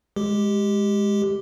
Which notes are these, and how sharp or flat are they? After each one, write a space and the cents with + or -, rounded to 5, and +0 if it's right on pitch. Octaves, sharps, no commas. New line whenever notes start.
G#3 +0 G4 +0